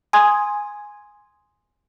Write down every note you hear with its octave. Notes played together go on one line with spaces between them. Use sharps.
G#5 C6 D#6 G#6